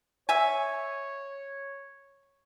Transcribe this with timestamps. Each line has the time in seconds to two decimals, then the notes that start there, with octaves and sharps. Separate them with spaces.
0.29 C#5 E5 G#5